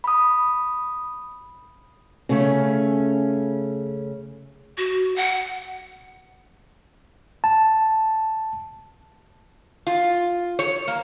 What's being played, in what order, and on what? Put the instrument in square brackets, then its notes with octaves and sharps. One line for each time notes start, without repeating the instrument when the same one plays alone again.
[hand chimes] B5 D#6
[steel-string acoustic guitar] C#3 A3 C#4
[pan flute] F#4
F#5
[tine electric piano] A5
[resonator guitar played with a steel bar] F4
C#5
A#3